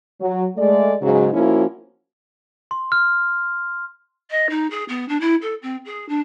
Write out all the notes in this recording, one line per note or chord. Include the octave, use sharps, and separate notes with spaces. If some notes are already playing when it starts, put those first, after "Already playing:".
F#3
G#3 A3 D5
G#2 C#3 F#3
F3 A#3 C#4 E4 F#4
C6
F6
D#5
D#4
G#4
B3
D4
E4
A4
C4
G#4
D4